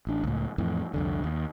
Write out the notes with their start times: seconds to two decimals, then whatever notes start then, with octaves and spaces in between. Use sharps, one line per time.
0.07 A1 D4
0.24 C#2 A2
0.58 F2 A2 E3
0.94 C2 F2 D3
1.24 D#2